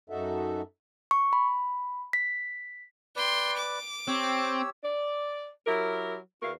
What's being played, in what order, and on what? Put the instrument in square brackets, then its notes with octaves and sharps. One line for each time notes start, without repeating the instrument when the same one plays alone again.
[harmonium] F#2 D#4 F#4 A4 E5
[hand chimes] C#6
B5
B6
[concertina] B4 D5 [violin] G5 C6
[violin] D6
[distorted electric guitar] C4 [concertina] G4 C#5 E6
[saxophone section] D5
F#3 E4 G4 A#4
E2 E4 F#4 A#4 F5